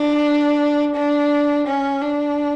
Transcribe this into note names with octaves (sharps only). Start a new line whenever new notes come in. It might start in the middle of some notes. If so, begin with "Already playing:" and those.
Already playing: D4
D4
C#4
D4